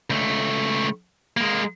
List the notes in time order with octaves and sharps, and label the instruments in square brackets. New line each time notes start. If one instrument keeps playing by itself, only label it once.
[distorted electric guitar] C#2 A3
G#3 A#3